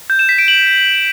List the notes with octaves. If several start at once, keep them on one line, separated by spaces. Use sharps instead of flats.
G6
E7
B6
D7
F#7